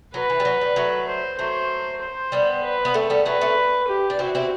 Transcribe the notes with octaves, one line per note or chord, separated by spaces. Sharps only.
F#3 B4
E3
G3
F#3
G3
F#3 A3
C5
F#3 A3 C5
C5
G3 B3
B4
B3
A3 C4 A4
G3 B3
F#3 A3 B4
A3 C4
G4
D4
C4 E4 F#4
C4 E4